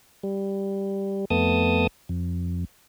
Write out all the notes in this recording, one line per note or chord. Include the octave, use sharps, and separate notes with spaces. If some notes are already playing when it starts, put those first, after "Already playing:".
G3
F2 A3 B3 A5 D#6
F2